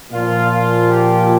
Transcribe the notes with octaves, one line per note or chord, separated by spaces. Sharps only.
A#2 F3 F4
F4
G4